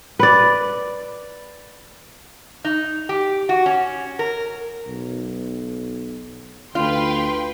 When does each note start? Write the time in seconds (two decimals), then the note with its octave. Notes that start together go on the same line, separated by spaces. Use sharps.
0.19 B4 D5
2.64 D#4
3.09 G4
3.49 F#4
3.66 C#4
4.19 A#4
4.87 B1
6.75 D2 F4 B4 G5 C6